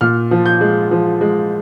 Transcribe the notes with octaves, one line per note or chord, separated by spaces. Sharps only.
A#2 F6
F3
G6
G#3
F3
G#3